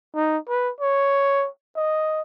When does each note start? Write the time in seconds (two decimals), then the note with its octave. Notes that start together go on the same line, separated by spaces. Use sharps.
0.15 D#4
0.48 B4
0.80 C#5
1.76 D#5